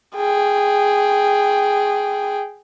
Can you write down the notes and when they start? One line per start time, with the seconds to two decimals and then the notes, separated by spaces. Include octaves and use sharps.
0.16 G#4 G5